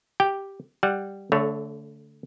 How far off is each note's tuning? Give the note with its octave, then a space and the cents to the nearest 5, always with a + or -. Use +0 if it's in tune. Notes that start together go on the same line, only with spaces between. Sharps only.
G4 +0 G5 +0
G3 +0 F#5 +0
D3 -30 A3 +0 C#5 +0